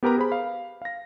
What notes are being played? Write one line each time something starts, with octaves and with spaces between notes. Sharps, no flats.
B3 G4 A#4 B4 A#5
G#4 C5 B5
F5
F5 A#6